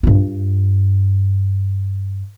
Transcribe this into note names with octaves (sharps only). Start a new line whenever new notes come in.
G2 F4